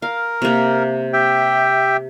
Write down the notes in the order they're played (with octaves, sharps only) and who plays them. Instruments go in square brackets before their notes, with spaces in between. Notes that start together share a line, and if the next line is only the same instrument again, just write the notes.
[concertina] A#4 [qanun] F5
[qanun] C3 A#3
[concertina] G4 E5 G5